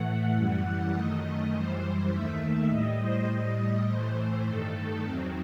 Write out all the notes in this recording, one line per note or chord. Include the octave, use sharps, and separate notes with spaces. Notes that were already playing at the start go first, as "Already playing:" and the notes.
Already playing: A2 E3 A3 F#5
F#2 E3 G3 F#5
F#2 D#3 A3 D#5
F#2 E3 G3 C5
D#2 D#3 A3 E5
A2 G3 D#5
C5
A2 G3 D#5
D#5
A2 E3 A3 C5
G2 D#3 A3 A4
E2 D#3 F#3 C4